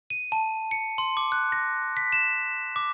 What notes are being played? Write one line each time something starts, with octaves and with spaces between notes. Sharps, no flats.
D#7
A5
C#7
C6
D6
F#6
A#6
B6
E7
D6